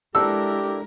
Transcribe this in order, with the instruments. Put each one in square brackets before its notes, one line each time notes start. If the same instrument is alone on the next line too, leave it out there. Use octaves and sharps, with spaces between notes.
[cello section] G#3 E4 A#4 [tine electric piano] D4 A4 [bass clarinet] G4 [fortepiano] E6